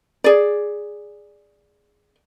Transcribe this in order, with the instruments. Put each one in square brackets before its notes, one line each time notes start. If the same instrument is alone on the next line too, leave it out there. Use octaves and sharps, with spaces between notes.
[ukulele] G#4 D5